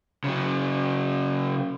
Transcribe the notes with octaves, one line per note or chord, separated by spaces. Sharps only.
C#3 F#3